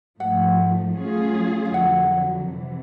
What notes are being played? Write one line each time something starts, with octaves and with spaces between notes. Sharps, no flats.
G#2 F3 A3 F#5
F#3 A3 C#4 F4 G#4
F5
F2 D3 F#3 F#5
C3 E3